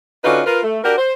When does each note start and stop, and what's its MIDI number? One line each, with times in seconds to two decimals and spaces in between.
0.24 0.42 50
0.24 0.42 61
0.24 0.42 63
0.24 0.42 65
0.24 0.42 66
0.24 0.42 71
0.45 0.63 65
0.45 0.63 70
0.45 0.63 71
0.63 0.79 57
0.84 0.95 62
0.84 0.95 66
0.84 0.95 67
0.84 0.95 70
0.98 1.13 72